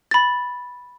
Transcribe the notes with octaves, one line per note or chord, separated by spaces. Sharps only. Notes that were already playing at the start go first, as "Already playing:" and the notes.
B5 A6